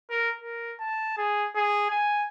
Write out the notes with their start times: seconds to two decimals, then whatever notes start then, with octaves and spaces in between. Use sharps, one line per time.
0.10 A#4
0.41 A#4
0.80 A5
1.17 G#4
1.55 G#4
1.90 G#5